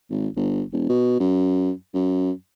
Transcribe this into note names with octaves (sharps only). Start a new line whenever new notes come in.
G#1
G1
E1
B2
F#2
F#2